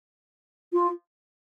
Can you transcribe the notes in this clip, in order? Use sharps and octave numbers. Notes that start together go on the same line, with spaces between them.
F4